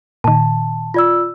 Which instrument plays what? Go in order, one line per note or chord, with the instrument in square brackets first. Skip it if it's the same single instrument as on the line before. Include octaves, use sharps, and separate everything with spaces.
[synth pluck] A#2 D#3 [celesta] A5
[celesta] F4 D5 E6